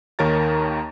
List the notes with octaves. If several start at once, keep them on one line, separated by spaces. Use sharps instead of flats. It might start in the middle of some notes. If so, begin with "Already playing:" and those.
D#2 D#3 A#4 C#5 A#5 A6